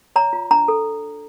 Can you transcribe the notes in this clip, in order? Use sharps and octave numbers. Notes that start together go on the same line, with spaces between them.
C#5 A#5
F4
D4 A#5
A4